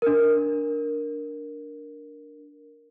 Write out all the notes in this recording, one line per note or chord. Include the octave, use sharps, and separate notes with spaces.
D4 A#4